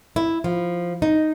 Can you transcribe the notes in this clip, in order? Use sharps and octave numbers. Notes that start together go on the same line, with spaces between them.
E4
F3
D#4